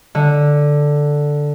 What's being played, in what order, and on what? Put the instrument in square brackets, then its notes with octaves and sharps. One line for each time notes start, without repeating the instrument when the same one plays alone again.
[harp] D3